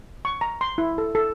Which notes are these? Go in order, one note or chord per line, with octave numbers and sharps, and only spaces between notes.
C#6
A#5
C6
E4
A4
A4